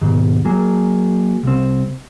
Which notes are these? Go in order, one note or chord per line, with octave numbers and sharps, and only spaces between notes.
D#2 G#2 B2
F#3 A#3 G#4
C2 C4